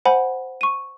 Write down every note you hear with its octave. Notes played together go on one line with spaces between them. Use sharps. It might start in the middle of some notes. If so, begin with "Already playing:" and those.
C5 F#5 G#5 B5
C#6 D#7